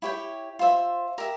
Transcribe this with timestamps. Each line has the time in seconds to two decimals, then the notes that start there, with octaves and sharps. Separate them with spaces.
0.02 E4 G4 C#5 G5
0.59 F4 C5 E5
1.18 G4 A#4 E5